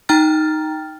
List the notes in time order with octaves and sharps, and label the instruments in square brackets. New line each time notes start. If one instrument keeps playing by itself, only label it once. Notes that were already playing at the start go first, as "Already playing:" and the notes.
[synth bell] D#4 G5 A#5 F6 A6